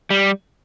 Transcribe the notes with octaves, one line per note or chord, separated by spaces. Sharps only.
G3